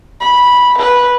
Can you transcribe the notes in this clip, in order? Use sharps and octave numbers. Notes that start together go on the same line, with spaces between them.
B5
B4